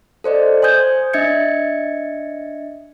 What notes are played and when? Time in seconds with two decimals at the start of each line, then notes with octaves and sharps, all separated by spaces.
0.24 A4 C5 D5 D#5
0.62 C5 G#5 D#6 G6 G#6
1.13 D4 D#5 E5 G#6 A6 C#7